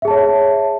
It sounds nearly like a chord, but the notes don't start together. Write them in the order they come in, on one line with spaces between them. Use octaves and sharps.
E5 G#4 A5 C#5